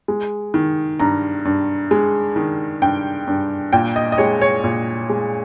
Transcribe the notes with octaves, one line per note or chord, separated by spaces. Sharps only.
G#3
D#3
G2 A#5
G2
G#3
D#3
G2 G5
G2
A#2 G5
D#5
D#5
G#3 C#5
C#5
A#2
G#3